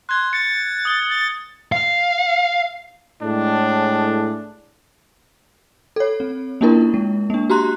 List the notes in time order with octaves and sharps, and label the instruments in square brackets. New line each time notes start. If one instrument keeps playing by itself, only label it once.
[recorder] C6 [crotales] F#6 G#6
[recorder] A6 [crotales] C#7
[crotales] D#6 G7
[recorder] A6
[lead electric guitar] F5
[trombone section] A2 G#3 [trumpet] D4
[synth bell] A4 C#5
C4
A#3 C#4 D4 E4 F4 A#4
G#3
A#3 D4
F#4 G4 A#5 C6 F#6